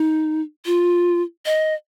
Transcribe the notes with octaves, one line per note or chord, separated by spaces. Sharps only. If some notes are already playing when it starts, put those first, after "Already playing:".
Already playing: D#4
F4
D#5